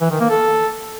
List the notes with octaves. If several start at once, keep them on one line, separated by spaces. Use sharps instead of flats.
E3
D#3
A#3
A4